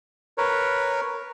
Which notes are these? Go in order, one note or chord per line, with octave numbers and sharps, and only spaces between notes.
A#4 B4 C#5